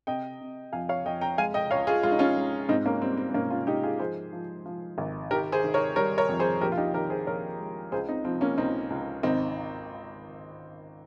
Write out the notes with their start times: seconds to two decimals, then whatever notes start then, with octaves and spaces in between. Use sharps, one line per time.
0.07 C3 D#5 G5
0.41 C3
0.72 F2 F5 G#5
0.89 C#5 F5
1.05 F2 D#5 G5
1.21 G5 A#5
1.38 G#3 F5 G#5
1.54 D#5 G5
1.71 C#2 C#5 F5
1.87 F4 G#4
2.03 G#3 F4
2.12 D#4
2.19 C#4 F4
2.37 G#3
2.69 G#2 C4 D#4
2.85 A#3 C#4
3.02 G3 C4
3.17 C4
3.30 C4
3.34 G#2 A#3 C#4
3.50 C#4 F4
3.67 G#2 D#4 G4
3.83 F4 G#4
3.99 F3 G#4 C5
4.33 F3
4.66 F3
4.98 G#1
5.31 D#3 G4 A#4
5.52 G#4 C5
5.64 D#3
5.74 A#4 C#5
5.96 G3 A#4 C#5
6.18 A#4 C#5
6.29 F2
6.39 G#4 C5
6.61 A#1 G4 A#4
6.72 F4
6.77 D#4 G4
6.94 D#3 G4 A#4
7.10 G#4 C5
7.27 A#1 A#4 C#5
7.59 G#3
7.92 C#2 G#4 C5
8.09 C4 D#4
8.25 F3 C4
8.41 A#3 C#4
8.58 C#2 C4 D#4
8.90 C#2
9.23 G#1 C4 D#4